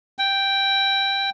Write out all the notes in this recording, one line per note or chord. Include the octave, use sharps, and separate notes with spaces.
G5